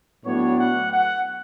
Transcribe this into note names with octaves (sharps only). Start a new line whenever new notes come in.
A2 F#3 B3 D4 C#5
F#5
F#5